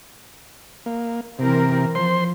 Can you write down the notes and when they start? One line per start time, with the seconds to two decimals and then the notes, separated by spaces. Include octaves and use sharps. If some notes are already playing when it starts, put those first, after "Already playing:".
0.86 A#3
1.39 C3 E3 C4 A#4
1.95 F3 C5 C6